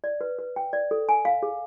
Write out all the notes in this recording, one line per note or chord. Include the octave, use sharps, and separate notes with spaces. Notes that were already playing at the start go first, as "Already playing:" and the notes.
D5
B4
B4
G5
D5
A4
G#5
F5
G#4